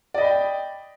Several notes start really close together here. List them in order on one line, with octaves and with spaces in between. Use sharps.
D5 D#5 B5 G5